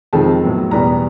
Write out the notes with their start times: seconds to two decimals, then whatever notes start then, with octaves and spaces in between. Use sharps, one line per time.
0.13 F2 C3 D#3 G#3 A5
0.43 A2 F#3 B3
0.71 E2 B2 G3 B3 A#5